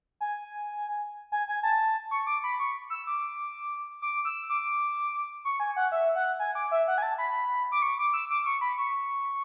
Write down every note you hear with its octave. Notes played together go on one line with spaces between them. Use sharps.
G#5
G#5
G#5
A5
C#6
D6
B5
C#6
E6
D6
D6
E6
D6
C#6
G#5
F#5
E5
F#5
G#5
D6
E5
F#5
G#5
A5
B5
D6
C#6
D6
E6
D6
C#6
B5
C#6